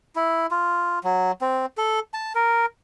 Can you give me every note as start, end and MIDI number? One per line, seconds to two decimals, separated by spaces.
0.16 0.46 64
0.51 0.99 65
1.04 1.32 54
1.41 1.66 60
1.77 2.00 69
2.14 2.33 81
2.35 2.66 70